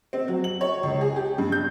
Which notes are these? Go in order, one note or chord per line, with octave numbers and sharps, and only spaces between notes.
C4
F#3
F#7
C#5
C#2
G#4
G4
G2
G6